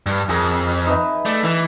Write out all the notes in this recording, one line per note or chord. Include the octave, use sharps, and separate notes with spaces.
G2
F2 G#4 A#4
D#4 B4 E5
A3 D5
E3